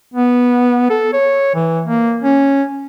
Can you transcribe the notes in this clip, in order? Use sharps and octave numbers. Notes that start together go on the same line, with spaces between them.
B3
A4
C#5
E3
A#3
C#4